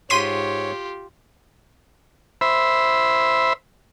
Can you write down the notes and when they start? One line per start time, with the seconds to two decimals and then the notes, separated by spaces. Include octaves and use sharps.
0.10 G#2 F4 G4 C#5 C6 B6 D#7
2.41 C5 E5 B5